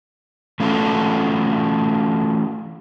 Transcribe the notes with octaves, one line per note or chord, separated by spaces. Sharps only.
E3 A3 C#4 F4 F#4 A4